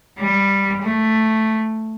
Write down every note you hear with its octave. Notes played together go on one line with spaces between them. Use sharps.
G3
A3